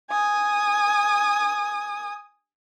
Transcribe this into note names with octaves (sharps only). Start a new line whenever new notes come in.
G#5 D#6